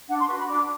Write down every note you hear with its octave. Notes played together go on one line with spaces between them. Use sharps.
D4 F#5
C6
F#4 B4 C#6
B5
D4 D6